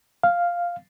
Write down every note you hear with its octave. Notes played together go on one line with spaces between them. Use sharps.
F5